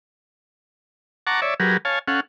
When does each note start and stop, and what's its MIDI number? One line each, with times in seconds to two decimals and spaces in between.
1.27 1.41 78
1.27 1.41 81
1.27 1.41 82
1.27 1.41 85
1.27 1.41 86
1.42 1.54 73
1.42 1.54 74
1.42 1.54 76
1.60 1.77 54
1.60 1.77 67
1.60 1.77 68
1.60 1.77 70
1.60 1.77 71
1.85 1.99 73
1.85 1.99 77
1.85 1.99 80
1.85 1.99 81
2.08 2.20 61
2.08 2.20 69
2.08 2.20 77
2.08 2.20 78